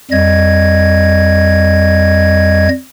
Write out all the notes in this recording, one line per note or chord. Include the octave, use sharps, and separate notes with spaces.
F2 G3 D#5 G#6